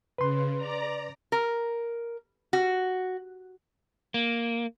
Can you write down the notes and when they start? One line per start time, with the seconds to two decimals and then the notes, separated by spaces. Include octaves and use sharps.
0.18 C#3 B4 C6
0.56 D5 A#5
1.32 A#4
2.53 F#4
4.14 A#3